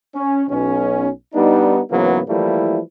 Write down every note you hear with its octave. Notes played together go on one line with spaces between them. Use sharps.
C#4
B1 B2 C#4
G3 B3 D4 D#4
G#2 C#3 E3 F#3 A#3 B3
E3 F3 G3 A3 A#3 E4